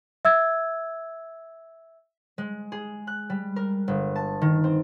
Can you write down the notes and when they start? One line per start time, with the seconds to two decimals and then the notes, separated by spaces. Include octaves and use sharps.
0.25 E5 E6 G#6
2.38 G#3
2.72 G#4
3.07 F#6
3.30 G3
3.56 A#4
3.88 G1
4.16 A5
4.42 D#3
4.64 C4